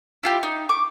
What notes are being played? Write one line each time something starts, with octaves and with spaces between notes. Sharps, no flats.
E4 F4 G4
D#4
C#6 D6